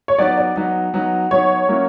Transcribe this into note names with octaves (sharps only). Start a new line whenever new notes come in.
C#5
F#3 B3 D#4 D5
D5
F#3 B3 D#4
F#3 B3 D#4
F#3 B3 D#4 C#5
F#3 A#3 C#4 E4